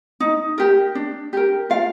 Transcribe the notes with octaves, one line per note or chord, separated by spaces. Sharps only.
D#4
G4 A#4
D4
G4 A#4
F4 F5